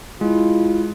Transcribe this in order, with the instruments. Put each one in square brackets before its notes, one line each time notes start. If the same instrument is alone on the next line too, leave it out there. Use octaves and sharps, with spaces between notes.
[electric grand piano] G#3 [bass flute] E4 [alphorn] F4